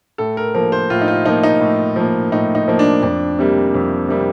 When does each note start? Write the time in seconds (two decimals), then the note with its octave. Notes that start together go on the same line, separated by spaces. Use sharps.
0.18 A2 A4
0.37 A#4
0.55 F3 A#3 A#4
0.72 C5
0.90 A2 F4
1.01 D#4
1.08 F4
1.26 F3 A#3 D#4
1.43 D#4
1.60 A2
1.96 F3 A#3
2.32 A2 D#4
2.55 D#4
2.68 F3 A#3
2.79 D4
3.03 F2 D4
3.39 C3 G3 A#3
3.74 F2
4.09 C3 G3 A#3